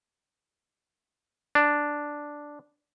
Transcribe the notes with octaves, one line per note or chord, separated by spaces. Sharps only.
D4